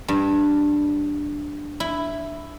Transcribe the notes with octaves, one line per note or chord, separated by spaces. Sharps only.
G2
E4